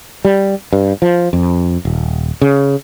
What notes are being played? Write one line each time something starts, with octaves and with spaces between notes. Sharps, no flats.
G3
G2
F3
F2
D#1
C#3